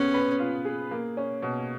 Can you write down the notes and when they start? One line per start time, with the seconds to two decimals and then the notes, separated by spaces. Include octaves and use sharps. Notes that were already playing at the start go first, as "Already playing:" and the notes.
Already playing: B3 C#4 G#4
0.14 B4
0.39 F4
0.65 G#4
0.91 A#3
1.17 C#4
1.42 B2